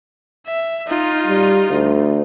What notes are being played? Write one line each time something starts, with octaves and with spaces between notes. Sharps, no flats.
E5
D#4 F4
G3
D2